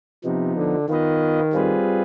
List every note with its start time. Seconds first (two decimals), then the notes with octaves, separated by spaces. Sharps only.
0.24 C3 F3 B3 D#4
0.57 D3
0.88 D#3 B3 F4 B4 D#5
1.53 G3 C4 F4 G#4 B4